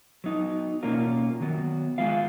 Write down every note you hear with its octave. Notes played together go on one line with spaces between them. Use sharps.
F#3 B3 D#4
B2 A#3 C#4 F4 A#4
D#3 F#3 B3
G#3 B3 F4 B4 F5